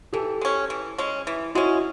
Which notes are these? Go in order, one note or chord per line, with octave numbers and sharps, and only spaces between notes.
E3 G4 A4
G#3 C#4
E3
G#3 C#4
E3
G#3 C#4 E4 F#4